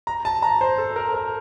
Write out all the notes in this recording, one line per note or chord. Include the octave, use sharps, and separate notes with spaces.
A#5
A5
A#5
C5
A4
A#4
A#4